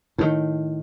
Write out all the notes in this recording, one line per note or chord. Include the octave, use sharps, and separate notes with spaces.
A2 D#3